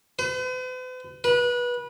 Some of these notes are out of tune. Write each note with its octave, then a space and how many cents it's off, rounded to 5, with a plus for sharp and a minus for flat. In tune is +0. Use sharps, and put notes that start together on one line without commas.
B4 +45
B4 -25